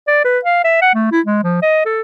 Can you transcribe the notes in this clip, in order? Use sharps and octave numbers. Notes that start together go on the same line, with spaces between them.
D5
B4
F5
E5
F#5
A3
E4
G#3
F3
D#5
A4